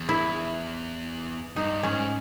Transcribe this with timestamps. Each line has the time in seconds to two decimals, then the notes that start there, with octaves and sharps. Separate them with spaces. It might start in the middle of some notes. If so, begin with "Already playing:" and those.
Already playing: E2
0.09 E4
1.56 G2 D#4
1.83 G#2 C#4